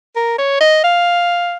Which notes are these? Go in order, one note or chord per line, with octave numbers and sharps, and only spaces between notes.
A#4
C#5
D#5
F5